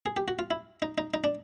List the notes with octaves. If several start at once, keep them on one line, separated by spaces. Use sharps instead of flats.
G#4
G4
F#4
F4
E4
D#4
D#4
D#4
D4